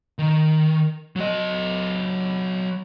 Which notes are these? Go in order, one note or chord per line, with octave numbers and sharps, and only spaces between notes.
D#3
F#3 D#5